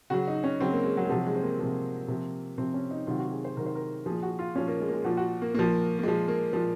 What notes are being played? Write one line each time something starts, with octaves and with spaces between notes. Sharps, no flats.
C#3 F#3 F#4
D#4
C#4
C#3 F#3 C4
A#3
G#3
F#3
G#3
C3 F3 F#3
G#3
C4
A#3
C3 F3
C3 F3
C3 F3 C4
C#4
D#4
C3 D#3 F#3 F4
F#4
G#4
C5
C3 D#3 F#3 A#4
C5
A#4
A#2 F3 G#4
F#4
F4
A#2 F3 C#4
A#3
G#3
A#3
G#3
A#2 F3 F#4
F#4
A#3
A#2 F3 A#3
A#3
A#2 F3 G#3
A#3
A#2 F3